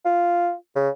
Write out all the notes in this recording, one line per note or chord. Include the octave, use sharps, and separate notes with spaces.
F4
C#3